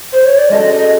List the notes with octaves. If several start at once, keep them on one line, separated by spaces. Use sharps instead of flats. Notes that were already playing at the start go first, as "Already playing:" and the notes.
C5
C#5
D5
G#3 C#4 F#4 A4 D#5
D#5